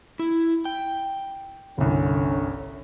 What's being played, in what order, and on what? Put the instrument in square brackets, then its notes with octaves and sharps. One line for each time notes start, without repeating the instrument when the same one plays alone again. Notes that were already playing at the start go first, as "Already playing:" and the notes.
[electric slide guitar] E4
G5
[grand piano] G1 C2 [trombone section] D3 C#4